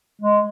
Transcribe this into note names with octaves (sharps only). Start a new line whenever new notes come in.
G#3